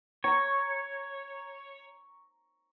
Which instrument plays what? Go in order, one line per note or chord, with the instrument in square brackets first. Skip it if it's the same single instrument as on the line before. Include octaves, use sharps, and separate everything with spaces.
[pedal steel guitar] C#5 [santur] A#5 C#6